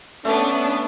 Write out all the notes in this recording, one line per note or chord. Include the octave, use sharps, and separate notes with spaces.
A3 B3 C#4 D4